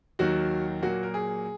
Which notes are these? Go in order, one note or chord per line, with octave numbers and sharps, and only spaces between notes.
D#2 D#3 F#3 F#4
A#2 F#3 A#3 F#4
A#4
G#4